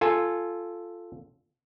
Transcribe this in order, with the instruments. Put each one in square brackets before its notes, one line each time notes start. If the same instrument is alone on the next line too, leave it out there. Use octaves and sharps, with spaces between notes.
[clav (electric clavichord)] F4 A4 G#5